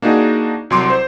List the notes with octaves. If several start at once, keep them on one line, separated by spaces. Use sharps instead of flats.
A#3 D4 D#4 F#4 G#4
C2 F#3 C6 D6
C5